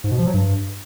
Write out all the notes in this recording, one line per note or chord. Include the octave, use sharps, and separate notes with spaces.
G#2
B2
F3
F#3
G2